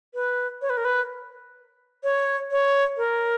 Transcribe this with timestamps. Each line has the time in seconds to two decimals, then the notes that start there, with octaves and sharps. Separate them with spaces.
0.14 B4
0.62 C#5
0.70 B4
0.77 A#4
0.85 B4
2.04 C#5
2.51 C#5
2.97 A#4